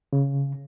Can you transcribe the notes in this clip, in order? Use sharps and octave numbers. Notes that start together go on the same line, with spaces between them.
C#3